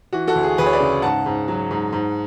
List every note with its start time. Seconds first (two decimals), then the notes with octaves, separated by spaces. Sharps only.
0.13 E3 F#4
0.27 F#4 A4
0.35 D2
0.43 G#4
0.58 D2 G#4 B4
0.66 C#5
0.73 B4 D5
0.80 C#3
1.02 G#2 F#5 A5
1.26 G#2
1.48 F#3
1.71 G#2
1.93 G#2